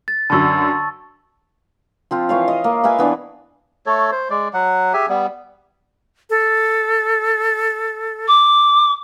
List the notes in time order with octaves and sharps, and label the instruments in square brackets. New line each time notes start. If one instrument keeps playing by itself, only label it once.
[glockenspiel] A6
[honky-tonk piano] F#2 D3 [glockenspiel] A5 C#6 E6
[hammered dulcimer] F3 C4 F4
E3 F4 C#5 F5
D#5
A#3
B4 E5 F5 G#5
E3 B3 D4
[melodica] A3 A4 C#5
C5
G#3 D5
F#3 F#5
G4 G#4 E5 G#5
G3 B3
[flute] A4
[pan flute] D6